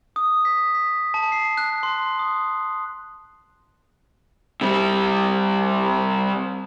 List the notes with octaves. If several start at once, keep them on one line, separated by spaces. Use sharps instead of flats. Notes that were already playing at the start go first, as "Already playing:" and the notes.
D#6
B6
B6
A5
C7
F#6
C6
D#6
C3 G3